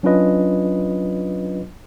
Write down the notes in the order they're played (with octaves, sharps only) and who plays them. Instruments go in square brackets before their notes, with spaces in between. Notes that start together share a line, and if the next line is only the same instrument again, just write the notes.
[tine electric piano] F#3 C#4 D4 F4 B4 D#5